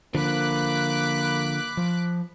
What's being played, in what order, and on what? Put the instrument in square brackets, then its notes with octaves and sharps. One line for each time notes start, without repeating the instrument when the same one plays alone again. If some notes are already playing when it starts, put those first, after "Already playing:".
[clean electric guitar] D3 F3 [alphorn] A#3 [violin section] B5 D6 F#6
[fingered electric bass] F3